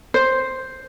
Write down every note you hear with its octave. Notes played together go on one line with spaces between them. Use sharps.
C5